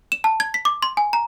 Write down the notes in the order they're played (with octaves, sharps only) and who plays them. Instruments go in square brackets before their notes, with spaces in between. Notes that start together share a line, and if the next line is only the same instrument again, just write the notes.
[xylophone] E7
A5
G#6
B6
D6
C6
G#5
A#5